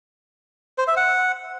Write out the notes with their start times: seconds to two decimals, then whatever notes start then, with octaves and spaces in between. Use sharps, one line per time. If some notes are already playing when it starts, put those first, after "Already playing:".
0.78 C5
0.87 E5
0.97 F#5